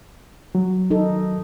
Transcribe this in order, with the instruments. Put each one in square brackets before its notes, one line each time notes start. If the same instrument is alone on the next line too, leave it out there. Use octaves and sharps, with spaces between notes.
[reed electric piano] F#3
[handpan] D#4 A4